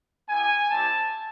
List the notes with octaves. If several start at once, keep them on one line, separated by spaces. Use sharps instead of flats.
B3 E4 G4 G#5
G3 C4 E4 G4 A5